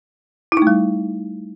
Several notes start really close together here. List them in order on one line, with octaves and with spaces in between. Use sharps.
E4 D#4 A3 G3